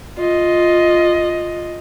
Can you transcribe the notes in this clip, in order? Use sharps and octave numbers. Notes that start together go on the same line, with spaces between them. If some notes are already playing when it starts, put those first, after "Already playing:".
F4 D#5